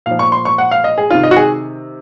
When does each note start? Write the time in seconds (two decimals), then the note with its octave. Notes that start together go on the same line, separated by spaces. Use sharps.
0.06 A#2 F3 F5
0.19 C#6
0.32 C6
0.45 C#6
0.58 F#5
0.71 F5
0.84 D#5
0.98 G#4
1.10 C3 D#3 F4
1.23 D#5
1.31 F#4
1.37 G#4